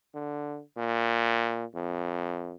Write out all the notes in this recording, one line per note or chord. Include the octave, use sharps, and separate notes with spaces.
D3
A#2
F2